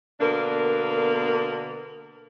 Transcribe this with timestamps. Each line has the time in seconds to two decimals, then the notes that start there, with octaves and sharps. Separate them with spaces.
0.21 B2 D3 A#3 B3 D4 A#4